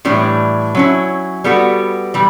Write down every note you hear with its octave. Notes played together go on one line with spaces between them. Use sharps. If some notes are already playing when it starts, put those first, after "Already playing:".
A2 E3 G3 D4
F#3 C#4 E4
G3 B3 F#4 A4
E3 G3